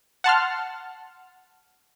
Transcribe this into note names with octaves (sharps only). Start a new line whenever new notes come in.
F#5 A5 C6 F6